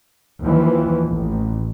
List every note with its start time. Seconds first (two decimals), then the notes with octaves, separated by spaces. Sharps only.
0.45 D#2 E3 F3
1.08 A1